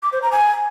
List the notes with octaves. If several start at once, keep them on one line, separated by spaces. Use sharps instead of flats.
D6
C5
A#5
G#5